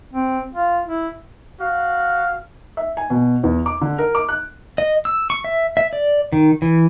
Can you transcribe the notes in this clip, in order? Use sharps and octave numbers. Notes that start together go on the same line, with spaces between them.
C4
F4
E4
F#4 F5
E5
G#5
B2
E2
D6
D3
A#4
D6
F#6
D#5
E6
C#6
E5
E5
D5
D#3
E3